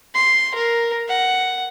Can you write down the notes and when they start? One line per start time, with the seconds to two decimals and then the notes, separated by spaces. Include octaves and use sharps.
0.15 C6
0.55 A#4
1.09 F#5